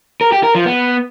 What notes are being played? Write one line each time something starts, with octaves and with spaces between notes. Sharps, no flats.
A#4
G4
A#4
F3
B3